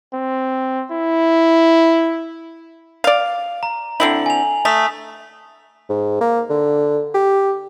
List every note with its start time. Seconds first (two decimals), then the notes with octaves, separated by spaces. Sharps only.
0.13 C4
0.91 E4
3.04 D5 F5
3.63 A#5
4.00 D3 C4 E4 F#7
4.26 G#5 F7
4.65 A3 D#6 B6 F7
5.89 G#2
6.21 A#3
6.50 D3
7.14 G4